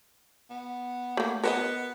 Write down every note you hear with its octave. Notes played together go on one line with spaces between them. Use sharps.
B3
A3 A#3
B3 A#4 C5 D#5